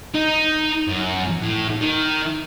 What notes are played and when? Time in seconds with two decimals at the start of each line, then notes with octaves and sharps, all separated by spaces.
0.15 D#4
0.87 F#2
1.42 A2
1.81 D#3